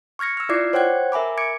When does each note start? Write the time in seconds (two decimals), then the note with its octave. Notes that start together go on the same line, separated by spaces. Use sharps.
0.19 C#6 F6 G#6 A#6 C#7
0.37 E6 F6
0.49 E4 F4 D5 D6 G#6 C7
0.73 C5 C#5 F#5 G5 F#6 G#6
1.12 A#4 E5 G#5 B5 D6
1.38 D6 G#6 C#7 D7